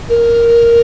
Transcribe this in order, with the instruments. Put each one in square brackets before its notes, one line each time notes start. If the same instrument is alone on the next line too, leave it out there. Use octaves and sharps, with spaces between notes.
[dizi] A#4